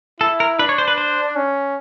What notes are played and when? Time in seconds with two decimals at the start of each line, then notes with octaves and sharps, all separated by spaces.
0.20 E4 A4
0.40 A#4
0.59 D4 B4
0.69 C#5
0.78 C5
0.88 B4
0.98 C5
1.36 C#4